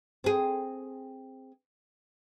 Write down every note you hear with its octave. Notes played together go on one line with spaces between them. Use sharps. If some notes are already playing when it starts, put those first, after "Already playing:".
C4 G#4